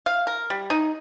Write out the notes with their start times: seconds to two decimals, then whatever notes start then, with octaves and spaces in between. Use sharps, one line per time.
0.06 F5
0.27 A#4
0.50 G3
0.70 D#4